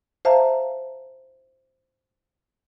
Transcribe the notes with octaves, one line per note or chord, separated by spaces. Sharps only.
C5 E5 F5 A5 A#5